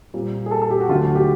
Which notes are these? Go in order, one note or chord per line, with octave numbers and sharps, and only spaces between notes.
A#2 G3 C4
G#4
A4
A4
G4
F#4
D2 D3 F#3 A3 F4
F#4
G4